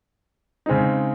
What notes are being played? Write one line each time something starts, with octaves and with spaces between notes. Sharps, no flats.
C#3 G#3 C4 D#4